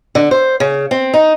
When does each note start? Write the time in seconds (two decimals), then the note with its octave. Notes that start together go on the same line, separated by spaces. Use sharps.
0.15 D3
0.31 C5
0.60 C#3
0.91 C4
1.14 D#4